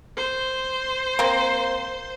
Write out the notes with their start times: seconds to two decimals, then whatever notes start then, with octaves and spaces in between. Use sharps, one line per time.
0.17 C5
1.19 A#3 C4